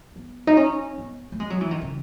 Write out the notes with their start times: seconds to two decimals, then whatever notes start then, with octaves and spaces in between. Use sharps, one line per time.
0.16 B3
0.47 D#4
0.57 C#4
0.98 B3
1.32 A3
1.40 G#3
1.50 F#3
1.61 E3
1.71 D#3
1.81 C#3